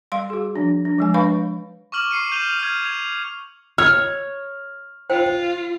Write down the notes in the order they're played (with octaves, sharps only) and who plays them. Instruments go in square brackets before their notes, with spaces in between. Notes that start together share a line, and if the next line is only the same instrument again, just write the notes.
[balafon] G3 F5 C6
F#4 G#4
F3 D4
D4
F3 G#3 G#5
D4 B4 C#5 F5 B5 C#6
[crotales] C#6 D6 F6 F#7
C#6 C7 C#7 D#7
G6 D#7 F7 G7
F6 G#6
G#6 F7
[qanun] C#5 [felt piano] F6
[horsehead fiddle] F4 [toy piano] C5 G5